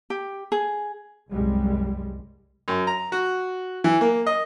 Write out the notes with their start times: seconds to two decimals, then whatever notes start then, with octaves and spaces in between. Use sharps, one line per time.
0.10 G4
0.52 G#4
1.31 C2 F#2 G3 G#3
2.68 F#2
2.87 A#5
3.12 F#4
3.84 E3
4.01 A#3
4.26 D#5